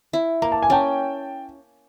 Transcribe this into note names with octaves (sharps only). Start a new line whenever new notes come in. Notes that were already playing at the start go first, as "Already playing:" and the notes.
E4
A#3 A#5
A5
G#5
C#4 G5 A5